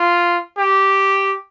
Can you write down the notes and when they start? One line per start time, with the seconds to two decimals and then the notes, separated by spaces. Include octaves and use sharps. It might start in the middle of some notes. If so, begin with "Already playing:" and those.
Already playing: F4
0.58 G4